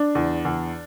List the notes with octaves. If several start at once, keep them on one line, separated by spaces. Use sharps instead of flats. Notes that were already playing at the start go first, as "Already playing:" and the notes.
Already playing: D4
E2
E2